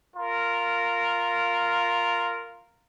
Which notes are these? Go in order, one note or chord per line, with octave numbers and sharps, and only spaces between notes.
F4 A#4